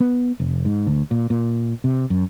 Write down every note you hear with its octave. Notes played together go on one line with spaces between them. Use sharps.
B3
F1
G#2
D2
A#2
A#2
C3
F#2